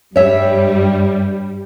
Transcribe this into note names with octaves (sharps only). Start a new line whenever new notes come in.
G2 G3 C#5 E5